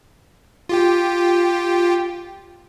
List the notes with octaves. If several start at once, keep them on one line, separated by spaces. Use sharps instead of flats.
F4 G4 G5